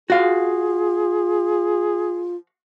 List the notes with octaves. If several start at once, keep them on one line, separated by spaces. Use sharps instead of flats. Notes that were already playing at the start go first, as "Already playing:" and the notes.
F4 F#4 G#4 F5